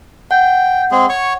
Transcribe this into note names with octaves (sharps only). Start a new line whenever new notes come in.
F#5 G5
G#3 C4 G#4
C#5 C#6